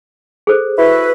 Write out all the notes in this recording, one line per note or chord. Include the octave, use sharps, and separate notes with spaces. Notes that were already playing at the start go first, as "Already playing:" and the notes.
G#4 A4 C5
E4 F#4 B4